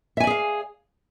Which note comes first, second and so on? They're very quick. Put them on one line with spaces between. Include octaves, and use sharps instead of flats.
E5 G#5 D5 G#4 F5